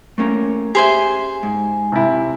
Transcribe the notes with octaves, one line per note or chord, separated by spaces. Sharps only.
A3 A#3 C#4
G4 G#4 C5 E5 G#5
G#2
C3 E4